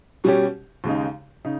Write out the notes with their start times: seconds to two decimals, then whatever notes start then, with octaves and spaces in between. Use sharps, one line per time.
0.24 B2 G3 C#4 G4
0.84 D#2 C#3 G#3 D#4
1.45 C#3 D#4